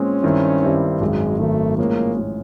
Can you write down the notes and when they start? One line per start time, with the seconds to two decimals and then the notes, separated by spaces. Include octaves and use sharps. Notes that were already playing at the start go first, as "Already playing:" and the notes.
Already playing: A#2 G#3 C4 C#4
0.23 G2 D#3 G3 C4 E4
0.62 G2 D#3 G3 C4 E4
1.00 G#1 F#2 D#3 G#3
1.39 G#1 F#2 D#3 A3
1.78 A2 F3 G#3 A#3 C#4
2.17 A2 F3 G#3 C#4